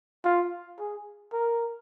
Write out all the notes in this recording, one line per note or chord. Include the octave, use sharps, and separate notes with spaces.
F4
G#4
A#4